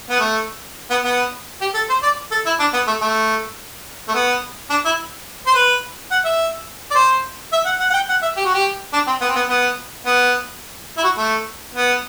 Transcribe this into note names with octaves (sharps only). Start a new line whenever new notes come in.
B3
A3
B3
B3
G4
A4
C5
D5
A4
E4
D4
B3
A3
A3
A3
B3
D4
E4
C5
B4
F#5
E5
D5
C5
E5
F#5
F#5
F#5
G5
F#5
E5
G4
F#4
G4
D4
C4
B3
C4
B3
B3
B3
E4
F#4
A3
B3